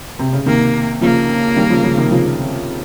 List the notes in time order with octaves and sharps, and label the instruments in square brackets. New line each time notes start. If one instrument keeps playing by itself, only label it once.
[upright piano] C3
C#3
[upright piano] C3 D#3 [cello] A#3
[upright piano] C#3 F3 [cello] A#3
[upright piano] D#3 G3
C#3 F3
C#3 F3
C3 D#3
C#3 F3